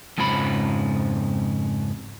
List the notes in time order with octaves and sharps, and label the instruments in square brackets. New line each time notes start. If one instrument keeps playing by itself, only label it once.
[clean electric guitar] F2 G#2 C#3 F3 B5